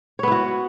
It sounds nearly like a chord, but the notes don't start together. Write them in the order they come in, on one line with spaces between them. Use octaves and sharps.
C#5 B3 E4 F#4